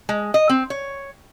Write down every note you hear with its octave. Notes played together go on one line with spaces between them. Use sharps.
G#3
D#5
C4
C#5